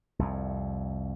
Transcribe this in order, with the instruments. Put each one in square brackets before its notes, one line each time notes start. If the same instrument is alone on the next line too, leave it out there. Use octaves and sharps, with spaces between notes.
[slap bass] C2 F2